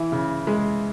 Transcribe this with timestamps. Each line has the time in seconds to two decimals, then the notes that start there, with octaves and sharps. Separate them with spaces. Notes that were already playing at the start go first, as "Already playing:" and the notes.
Already playing: E3 E4
0.12 C#3
0.47 G#3